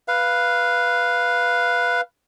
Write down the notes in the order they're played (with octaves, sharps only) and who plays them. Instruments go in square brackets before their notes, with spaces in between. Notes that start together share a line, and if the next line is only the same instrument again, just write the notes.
[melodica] B4 F5